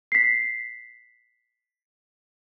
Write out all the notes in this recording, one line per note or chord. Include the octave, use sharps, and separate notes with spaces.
B6 C7